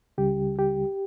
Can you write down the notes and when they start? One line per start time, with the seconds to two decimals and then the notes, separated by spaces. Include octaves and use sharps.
0.18 C#2 C#3 G3 G4
0.59 G4